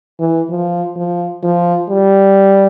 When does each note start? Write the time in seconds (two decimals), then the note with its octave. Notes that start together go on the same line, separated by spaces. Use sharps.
0.19 E3
0.50 F3
0.96 F3
1.43 F3
1.89 G3